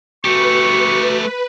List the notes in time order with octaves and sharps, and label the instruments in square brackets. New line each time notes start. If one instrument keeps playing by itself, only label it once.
[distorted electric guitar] A3 G4 [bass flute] F#4 [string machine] B4 [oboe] C#6